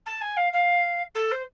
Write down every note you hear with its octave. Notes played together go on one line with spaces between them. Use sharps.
A5
G#5
F5
F5
A4
C5